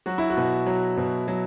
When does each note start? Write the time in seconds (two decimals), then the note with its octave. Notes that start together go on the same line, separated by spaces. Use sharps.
0.06 F#3 F#4
0.18 E4
0.30 F#4
0.37 B2
0.66 F#3
0.97 B2
1.28 F#3